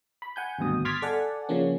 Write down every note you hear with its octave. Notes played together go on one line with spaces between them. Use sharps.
B5
F#5 G#5 G6
G#1 D2 G2 B2 D#6
C6 D6 F6 G#6 A6 B6
A4 D5 F#5 G#5
C#3 F3 A#3 C#4